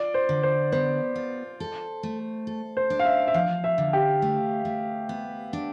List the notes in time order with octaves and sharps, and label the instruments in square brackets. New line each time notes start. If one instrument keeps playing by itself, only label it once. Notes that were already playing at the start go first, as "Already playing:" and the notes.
Already playing: [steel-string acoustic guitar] F4 [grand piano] D5
[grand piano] C5
[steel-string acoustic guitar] D3
[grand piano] C5
[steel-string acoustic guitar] B3 [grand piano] C5
[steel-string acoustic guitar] F4
A4
A3
A4
[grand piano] C5
[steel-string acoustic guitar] D4
[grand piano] F5
E5
E5
[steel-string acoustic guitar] F3 [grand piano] F5
[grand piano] E5
[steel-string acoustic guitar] D3
[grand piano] G4
[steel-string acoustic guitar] A3
A3
B3
D4